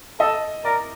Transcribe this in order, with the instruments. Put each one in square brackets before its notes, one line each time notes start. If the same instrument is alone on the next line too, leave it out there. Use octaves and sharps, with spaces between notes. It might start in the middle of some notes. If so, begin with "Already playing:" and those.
[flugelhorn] A4 [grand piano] D#5
[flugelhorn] A#4 [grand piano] D5